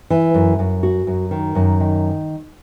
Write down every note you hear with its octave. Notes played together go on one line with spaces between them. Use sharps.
E3
F#2
F#2
F#4
F#2
D#3
F#2
D#3